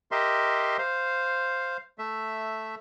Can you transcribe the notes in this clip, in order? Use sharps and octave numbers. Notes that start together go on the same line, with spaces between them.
G4 A#4 D#5 E5 C6
C5 F5
A3 E5